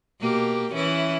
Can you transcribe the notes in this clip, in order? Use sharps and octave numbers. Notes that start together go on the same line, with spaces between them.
B2 A#3 G4
E3 C#4 E4